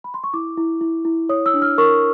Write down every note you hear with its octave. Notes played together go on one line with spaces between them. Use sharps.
B5
C6
C#6
E4 D6
E4
E4
E4
C#5 D#6
E6
D4
F6
A#4 C#6